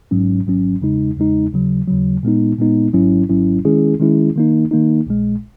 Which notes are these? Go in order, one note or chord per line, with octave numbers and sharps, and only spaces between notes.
G#1 G#2 F#3 C#4
G#1 G#2 F#3 C#4
E2 C#3 G#3 D#4
E2 C#3 G#3 D#4
D#2 C#3 F#3
D#2 C#3 F#3
A#2 G#3 B3 D#4
A#2 G#3 B3 D#4
G#1 G#2 F#3 C#4 E4
G#1 G#2 F#3 C#4 E4
D#3 G#3 C#4 E4 G#4
D#3 G#3 C#4 E4 G#4
D#3 A#3 D#4
D#3 A#3 D#4
A#1 A#2 G#3